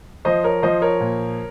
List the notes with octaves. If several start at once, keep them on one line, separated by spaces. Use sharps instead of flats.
F3 C5 D#5
A#4 C#5
F3 C5 D#5
A#4 C#5
A#2